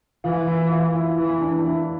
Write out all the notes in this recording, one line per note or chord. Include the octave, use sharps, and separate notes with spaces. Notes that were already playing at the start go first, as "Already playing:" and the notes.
E3 F4
E4
F4
E4
E3 E4
D4
D4
E4